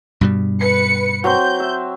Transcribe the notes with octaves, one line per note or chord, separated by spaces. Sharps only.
G2 B2 G3
B4 C#7
F#3 C4 G6
E5